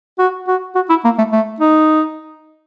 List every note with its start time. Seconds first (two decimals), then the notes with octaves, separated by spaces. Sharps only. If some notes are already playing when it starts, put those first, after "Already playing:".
0.19 F#4
0.47 F#4
0.75 F#4
0.89 E4
1.04 A#3
1.18 A3
1.32 A3
1.60 D#4